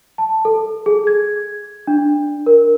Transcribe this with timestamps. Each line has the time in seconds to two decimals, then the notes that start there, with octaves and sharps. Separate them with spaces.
0.18 A5
0.45 A4
0.86 G#4
1.07 G#6
1.87 D4
2.46 A#4